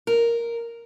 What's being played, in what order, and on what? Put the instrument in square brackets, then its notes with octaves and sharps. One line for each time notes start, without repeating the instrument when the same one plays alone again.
[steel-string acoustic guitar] A#4